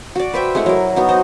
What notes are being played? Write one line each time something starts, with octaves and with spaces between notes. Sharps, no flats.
F#4 D5
B4 C5 E5 G5
G#3 A3 E4 F#5
F#3 A#4
B3 D#4 F#4
C5 D#5